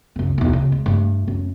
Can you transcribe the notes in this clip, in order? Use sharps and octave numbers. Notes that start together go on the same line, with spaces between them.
C#2 F#2
B1 E2
C#3
G#3
G2 A3
F#2